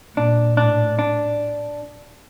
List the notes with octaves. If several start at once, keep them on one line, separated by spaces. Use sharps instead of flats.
A#2 D4
A2 D4
D4